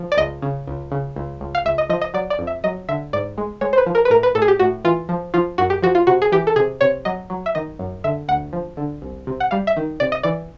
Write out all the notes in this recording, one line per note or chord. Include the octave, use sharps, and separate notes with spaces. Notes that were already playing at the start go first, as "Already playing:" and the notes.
Already playing: F3
D5
C#2 D#5
C#3
C#2
C#3
C#2
C#2
F5
C#2 E5
D#5
F3 D#5
D#5
F#3 D5
D5
F2
E5
F#3 D#5
D3 E5
G#2 D5
G#3
G#3 C#5
C5
B4
F3
A#4
B4
A2 A#4
B4
A2 A4
G#4
G4
A2 F#4
E3 F4
F3
F3 F4
F#2 F#4
G4
F3 F#4
F4
C3 F#4
G#4
E3 G4
A4
C3 G#4
C3 C#5
F#3 D#5
F#3
E5
D#3 D#5
F#2
D3 E5
D2 F#5
F3
D3
C2
C3
F#5
G3 F5
E5
D#3
C3 D5
D#5
E3 D5